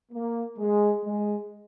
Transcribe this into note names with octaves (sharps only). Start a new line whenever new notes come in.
A#3
G#3
G#3